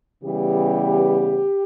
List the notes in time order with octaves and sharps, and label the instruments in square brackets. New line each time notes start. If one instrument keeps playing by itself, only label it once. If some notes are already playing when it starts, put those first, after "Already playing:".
[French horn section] C#3 E3 G3 B3 G4